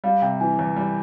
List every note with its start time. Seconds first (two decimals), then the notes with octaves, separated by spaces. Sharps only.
0.04 G3 F5
0.22 C3 G5
0.40 E3 G#5
0.59 E2
0.76 G3